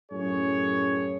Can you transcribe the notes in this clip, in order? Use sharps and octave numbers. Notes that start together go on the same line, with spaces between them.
F#2 A2 G#4 C#5